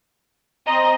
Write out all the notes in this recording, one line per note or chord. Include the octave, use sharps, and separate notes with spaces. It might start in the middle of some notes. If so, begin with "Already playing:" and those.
C4 D#5 A#5